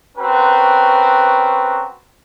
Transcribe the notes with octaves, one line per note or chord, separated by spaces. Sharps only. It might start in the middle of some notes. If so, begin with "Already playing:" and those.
C4 C#4 F#4 A#4 B4